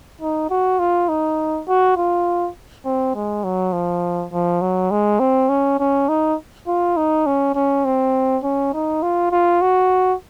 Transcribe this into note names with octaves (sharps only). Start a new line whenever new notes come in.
D#4
F#4
F4
D#4
F#4
F4
C4
G#3
F#3
F3
F3
F#3
G#3
C4
C#4
C#4
D#4
F4
D#4
C#4
C#4
C4
C#4
D#4
F4
F4
F#4